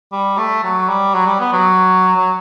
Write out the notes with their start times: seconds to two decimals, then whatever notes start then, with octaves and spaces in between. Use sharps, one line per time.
0.12 G3
0.38 A3
0.63 F#3
0.89 G3
1.15 F#3
1.27 G3
1.40 B3
1.53 F#3
2.16 F#3